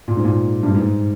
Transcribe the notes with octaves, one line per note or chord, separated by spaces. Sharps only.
A#2
G#2
A#2
G2
G#2